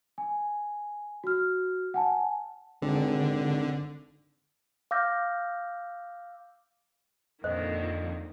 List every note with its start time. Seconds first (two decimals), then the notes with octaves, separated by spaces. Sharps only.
0.18 G#5
1.24 F#4 F6
1.94 F#5 G#5 A5
2.82 G#1 D3
4.91 F5 D6 E6 F6 G6 A#6
7.44 F2 A#2 D3 D#3 C5 D#5